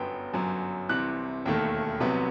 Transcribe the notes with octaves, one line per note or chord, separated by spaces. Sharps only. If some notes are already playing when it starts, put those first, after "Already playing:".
Already playing: G1 F#2 F#3 B3 G5
G1 F#2 F#3
C2 C3 E3 F#6
E1 D#2 D#3 A3
C2 C3 F#3 B3